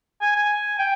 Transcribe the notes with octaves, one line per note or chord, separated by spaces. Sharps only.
G#5
G#5
G5